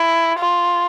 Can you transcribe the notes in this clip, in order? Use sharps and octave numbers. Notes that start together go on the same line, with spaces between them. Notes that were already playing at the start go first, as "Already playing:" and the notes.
Already playing: E4
F4